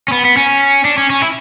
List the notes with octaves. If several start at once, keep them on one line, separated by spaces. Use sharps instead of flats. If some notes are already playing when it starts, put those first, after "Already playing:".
C#4
B3
B3
C#4
D4
C#4
C#4
E4